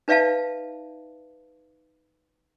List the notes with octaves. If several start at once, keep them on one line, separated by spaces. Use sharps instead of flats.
D#4 B4 D5 E5 F5 A5